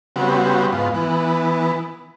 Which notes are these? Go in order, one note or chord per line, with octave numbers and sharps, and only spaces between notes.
C#3 G3 B3 C4 F#4
G#2 B3 F4
E3 B3